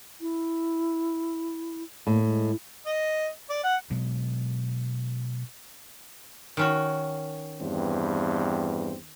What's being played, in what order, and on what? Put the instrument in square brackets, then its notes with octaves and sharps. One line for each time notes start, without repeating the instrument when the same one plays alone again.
[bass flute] E4
[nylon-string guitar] A2 [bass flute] A#3
[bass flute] G#3
[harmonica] D#5
D5
F#5
[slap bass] B2 F#3 G#3
[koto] D#3 C#4 F#4
[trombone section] E2 G2 C4